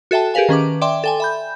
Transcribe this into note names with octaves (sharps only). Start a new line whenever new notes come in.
F#4 A4 E5 G5 A5
G4 G#4 A#4 B4 F5 G#5
D#3 C#4 B4 D6
D5 E5 G5 C6 D6
A4 G5 G#5
E5 B5 G6